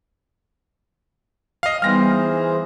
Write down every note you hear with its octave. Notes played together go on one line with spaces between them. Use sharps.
D#5 F5
E3 G3 B3 D#4 G#4 C5 F6 A#6